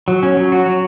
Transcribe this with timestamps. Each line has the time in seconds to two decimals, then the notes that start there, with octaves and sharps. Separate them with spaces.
0.08 F#3
0.23 C#4
0.37 F#3
0.52 F#4
0.66 F#3